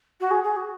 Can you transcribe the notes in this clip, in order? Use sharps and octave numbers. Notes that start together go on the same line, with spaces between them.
F#4
G#4
G#4
F#4